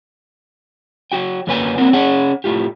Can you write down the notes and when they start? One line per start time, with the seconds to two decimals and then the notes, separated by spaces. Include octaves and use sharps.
1.12 F#3 F#4 G5
1.47 F#2 D3 F#3 A#3 B4 G#5
1.78 F#3 A#3 C4 A#4 F#5
1.93 C#4 G#4 C#5 F#5
2.44 A2 A3 F4 G4